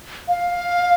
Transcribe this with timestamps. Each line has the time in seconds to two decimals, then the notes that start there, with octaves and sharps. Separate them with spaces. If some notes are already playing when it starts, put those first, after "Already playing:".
0.28 F5